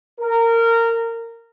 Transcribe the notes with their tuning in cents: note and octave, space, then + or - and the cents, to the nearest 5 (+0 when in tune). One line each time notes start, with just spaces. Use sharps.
A#4 -20